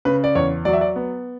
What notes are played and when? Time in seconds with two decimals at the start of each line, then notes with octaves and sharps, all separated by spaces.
0.05 C#3 B4
0.24 D5
0.35 E2 C#5
0.65 F#3 D5
0.73 E5
0.81 D5
0.96 B3